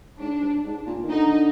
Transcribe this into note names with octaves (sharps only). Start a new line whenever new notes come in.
G#2 D4
G2
G#2
A#2
D#3
D3 D#4